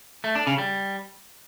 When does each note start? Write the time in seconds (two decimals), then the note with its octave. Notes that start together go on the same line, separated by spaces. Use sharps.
0.24 A3
0.35 D4
0.47 C#3
0.58 G3